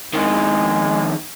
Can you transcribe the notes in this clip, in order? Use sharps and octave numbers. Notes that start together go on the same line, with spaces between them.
F2 D#3 G#3